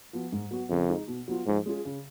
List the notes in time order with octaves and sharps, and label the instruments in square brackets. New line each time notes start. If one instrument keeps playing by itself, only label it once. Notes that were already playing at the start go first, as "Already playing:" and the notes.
[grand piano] F3 B3 F#4
G#2
F#3 B3 F#4
[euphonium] F2 [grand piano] C#3
[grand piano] G#3 D#4
B2
F#3 B3 F4
[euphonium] G#2 [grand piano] F3
[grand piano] G#3 C#4 F4 G#4
C#3